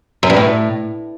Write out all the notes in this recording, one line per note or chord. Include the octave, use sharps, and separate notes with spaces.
F#2
G2
A2